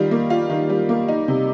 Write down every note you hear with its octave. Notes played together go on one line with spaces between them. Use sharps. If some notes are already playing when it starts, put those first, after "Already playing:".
Already playing: D#3 G3 F4
A#3
F4
D#3
G3
A#3
D#4
C3